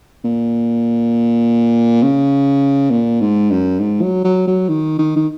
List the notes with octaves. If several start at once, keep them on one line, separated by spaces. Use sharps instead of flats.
A#2
C#3
A#2
G#2
F#2
G#2
F#3
F#3
F#3
D#3
D#3
D#3